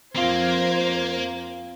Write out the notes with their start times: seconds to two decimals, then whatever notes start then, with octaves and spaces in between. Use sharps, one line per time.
0.16 F2 A#3 C4 F4 C5 G#6